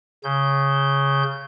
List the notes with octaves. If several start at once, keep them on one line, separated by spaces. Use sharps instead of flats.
C#3 G6